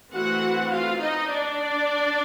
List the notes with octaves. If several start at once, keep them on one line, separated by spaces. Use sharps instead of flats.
E3 A3 C4 F#4 F#5
F4 F5
D#4 D#5
D4 D5